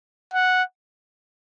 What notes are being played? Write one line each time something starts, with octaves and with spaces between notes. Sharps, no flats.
F#5